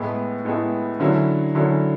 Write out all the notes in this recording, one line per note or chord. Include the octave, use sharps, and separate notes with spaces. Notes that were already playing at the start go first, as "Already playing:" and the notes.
Already playing: A2 G#3 B3 E4
A2 G#3 B3 E4
D3 F#3 C#4 E4
D3 F#3 C#4 E4